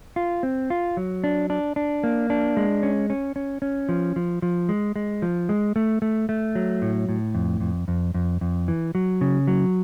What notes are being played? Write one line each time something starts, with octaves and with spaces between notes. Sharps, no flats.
F4
C4
F4
F#3
D4
D4
D4
A#3
D4
G#3
C#4
C#4
C#4
C#4
F3
F3
F3
G#3
G#3
F3
G#3
A3
A3
A3
F#3
A2
A2
F2
F2
F2
F2
F2
E3
F#3
C#3
F#3